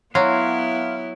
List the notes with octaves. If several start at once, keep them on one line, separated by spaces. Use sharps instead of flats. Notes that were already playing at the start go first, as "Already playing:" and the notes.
F#3 B3 E4 F5 C6